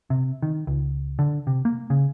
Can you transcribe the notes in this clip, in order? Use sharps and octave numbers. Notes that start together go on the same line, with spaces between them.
C3
D#3
C#2
D3
C3
A#3
C#3